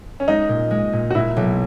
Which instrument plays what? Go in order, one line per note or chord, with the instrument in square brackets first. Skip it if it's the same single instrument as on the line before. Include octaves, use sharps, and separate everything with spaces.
[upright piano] C#4
[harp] G#3 [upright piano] D#4
[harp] A#2
G#3
A#2
[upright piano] F#4
[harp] A#2 [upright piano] E4
[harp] B1